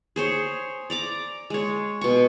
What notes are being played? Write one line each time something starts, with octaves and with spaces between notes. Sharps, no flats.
G#4 C5 C#5
D5 A#5 D6
G#3 C#5
B2 C#6